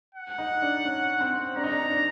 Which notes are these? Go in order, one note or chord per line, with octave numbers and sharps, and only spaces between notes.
F#5
D#4
D4
C#4
C4
D4 A#5
D#4
D4
D4